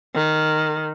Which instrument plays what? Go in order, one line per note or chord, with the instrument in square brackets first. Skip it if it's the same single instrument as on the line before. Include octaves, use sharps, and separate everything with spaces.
[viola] D#3